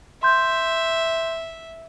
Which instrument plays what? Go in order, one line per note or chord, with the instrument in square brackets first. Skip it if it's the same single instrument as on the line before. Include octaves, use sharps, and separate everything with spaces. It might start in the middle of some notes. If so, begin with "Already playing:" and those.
[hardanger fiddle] E5 [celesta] C6 G6